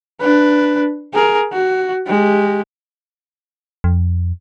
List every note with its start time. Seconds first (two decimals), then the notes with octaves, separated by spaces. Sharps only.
0.21 D4 B4
1.14 G#4 A#4
1.52 F#4
2.07 G#3 G4
3.84 F2